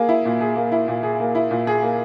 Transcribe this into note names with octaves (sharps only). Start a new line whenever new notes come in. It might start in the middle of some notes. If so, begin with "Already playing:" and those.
Already playing: A#3 G#4
E4
A#2
G#4
A#3
E4
A#2
G#4
A#3
E4
A#2
G#4
A#3